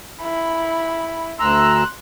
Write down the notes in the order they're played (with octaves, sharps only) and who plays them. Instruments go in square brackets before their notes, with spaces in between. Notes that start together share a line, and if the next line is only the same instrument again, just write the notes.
[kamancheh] E4 B5
[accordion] D2 A#5 E6 [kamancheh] C6 F#6